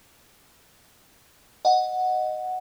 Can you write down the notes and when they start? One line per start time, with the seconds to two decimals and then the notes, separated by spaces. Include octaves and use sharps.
1.65 D#5 F#5